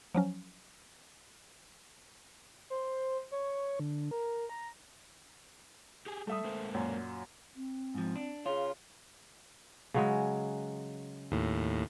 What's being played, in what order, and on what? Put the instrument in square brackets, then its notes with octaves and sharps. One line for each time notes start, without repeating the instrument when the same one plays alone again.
[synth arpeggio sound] F3 F#3 C#4
[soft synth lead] C5
C#5
D3
A#4
A#5
[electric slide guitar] G4 G#4 G#5
[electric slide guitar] G3 [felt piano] A3 E5 D#6
[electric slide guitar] G#3 A#3 C5
[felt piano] F#2 A#2 F#3
[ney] C4
[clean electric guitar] G#2 F3
D4
[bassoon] C#3 [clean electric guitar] F4 [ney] G#4
[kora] C#3 F#3 G#3
[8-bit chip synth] D#2 A2